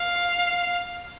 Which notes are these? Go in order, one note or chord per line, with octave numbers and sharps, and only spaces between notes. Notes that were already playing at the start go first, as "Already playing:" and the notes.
Already playing: F5